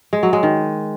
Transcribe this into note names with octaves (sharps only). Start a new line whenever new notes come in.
G#3
F#3
G#3
D#3